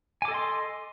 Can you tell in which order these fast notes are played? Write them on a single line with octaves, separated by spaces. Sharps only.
G#5 D6 A4 D#5 C6